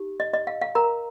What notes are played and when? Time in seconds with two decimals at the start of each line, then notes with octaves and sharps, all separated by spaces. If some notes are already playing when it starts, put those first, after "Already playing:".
Already playing: D#4 G4
0.20 D#5
0.34 D#5
0.47 F5
0.61 F5
0.75 A#4 A#5